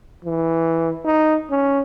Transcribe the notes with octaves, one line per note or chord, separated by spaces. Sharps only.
E3
D#4
C#4